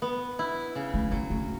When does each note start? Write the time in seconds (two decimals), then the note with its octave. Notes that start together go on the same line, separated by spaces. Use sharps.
0.02 B3
0.39 E4
0.75 C#3
0.94 A3
1.11 F#3 A3
1.30 A3